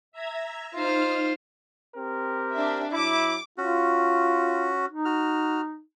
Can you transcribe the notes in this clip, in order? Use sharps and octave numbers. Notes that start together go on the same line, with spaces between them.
E5 A#5 G#6
D#4 F4 C5 F6
C4 G4 A#4
D4 E5
F#3 E4 D6
C#4 F4 F#4
D#4
F#4 F6